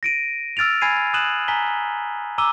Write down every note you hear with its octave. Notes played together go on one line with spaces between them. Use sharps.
A#6 D7 D#7
E6 F6 A6 D7 F7
G#5 B5 G#6 C7 D#7 F7
D#6 F#6 D#7 E7 F#7
G#5 A#5 B6 G7
A#5 D6 E6 D#7 G7